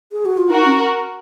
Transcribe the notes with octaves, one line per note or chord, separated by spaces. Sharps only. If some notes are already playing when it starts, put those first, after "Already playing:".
G#4
F#4
F4
D#4 F#4 A#4
C#4